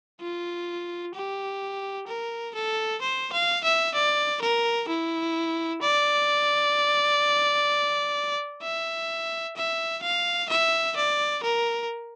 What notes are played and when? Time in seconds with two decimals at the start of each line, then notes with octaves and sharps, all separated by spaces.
0.21 F4
1.15 G4
2.07 A#4
2.55 A4
3.02 C5
3.32 F5
3.64 E5
3.95 D5
4.42 A#4
4.88 E4
5.82 D5
8.62 E5
9.56 E5
10.03 F5
10.49 E5
10.96 D5
11.43 A#4